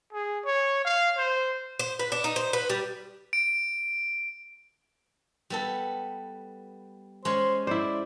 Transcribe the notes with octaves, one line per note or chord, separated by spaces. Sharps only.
G#4
C#5
F5
C5
C5
B4
D4
D#4
C5
B4
G3
D7
G3 B3 A4
G#3 C#4 C5
E4 C5 D5